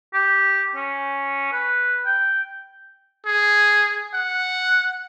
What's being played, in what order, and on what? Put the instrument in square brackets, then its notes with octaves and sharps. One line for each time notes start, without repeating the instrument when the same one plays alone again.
[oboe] G4
C#4
B4
G5
[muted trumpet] G#4
F#5